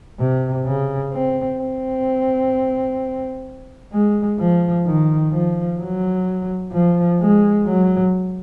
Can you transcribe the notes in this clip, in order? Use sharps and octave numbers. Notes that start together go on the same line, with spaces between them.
C3
C#3
C4
C4
G#3
F3
D#3
F3
F#3
F3
G#3
F#3